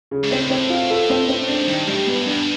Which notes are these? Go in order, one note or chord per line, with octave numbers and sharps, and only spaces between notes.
C#3
G#2
A2 C4
C4
F4
A4
C4
C4
G#2 D4
G2 D#3
A2 G3
G#2 B3
G2
F#2
G2 D4